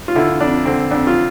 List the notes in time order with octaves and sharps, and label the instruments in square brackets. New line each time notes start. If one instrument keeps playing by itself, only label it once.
[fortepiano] F4
D3 E4
F2 D4
D3 C4
F2 D4
F4